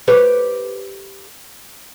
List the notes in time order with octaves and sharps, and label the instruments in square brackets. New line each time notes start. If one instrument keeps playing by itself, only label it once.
[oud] G4 B4 C#5